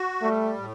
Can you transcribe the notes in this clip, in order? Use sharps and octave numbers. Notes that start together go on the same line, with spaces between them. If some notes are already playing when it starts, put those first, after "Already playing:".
Already playing: F#4
G3 A3
A2